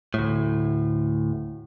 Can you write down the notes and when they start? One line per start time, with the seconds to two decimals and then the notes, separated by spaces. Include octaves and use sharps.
0.14 D2 A2